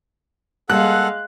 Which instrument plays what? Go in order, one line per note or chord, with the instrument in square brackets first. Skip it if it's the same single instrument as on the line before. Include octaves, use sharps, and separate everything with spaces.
[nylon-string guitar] G3 A#3 [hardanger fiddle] G#3 F5 [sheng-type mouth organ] A4 F#5 [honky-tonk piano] F#6